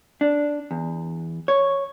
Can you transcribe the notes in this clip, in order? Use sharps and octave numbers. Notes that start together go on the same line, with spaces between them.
D4
E2
C#5